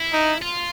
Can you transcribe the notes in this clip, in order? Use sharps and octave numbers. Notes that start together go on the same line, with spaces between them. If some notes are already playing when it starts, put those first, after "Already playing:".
Already playing: E4
D#4
F4